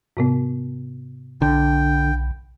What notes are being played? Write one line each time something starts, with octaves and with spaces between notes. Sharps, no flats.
G#2 C3 B3
B1 D3 G5